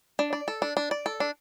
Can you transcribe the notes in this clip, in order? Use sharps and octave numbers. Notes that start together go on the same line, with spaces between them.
D4
D5
A4
D4
D4
D5
A4
D4